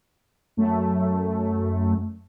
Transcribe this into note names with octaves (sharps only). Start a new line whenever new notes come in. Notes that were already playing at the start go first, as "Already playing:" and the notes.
F#2 A3